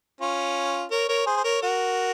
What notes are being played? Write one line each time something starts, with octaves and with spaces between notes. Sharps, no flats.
C#4 F4
A#4 C#5
A#4 C#5
G#4 C5
C5
A#4 C#5
F#4 A#4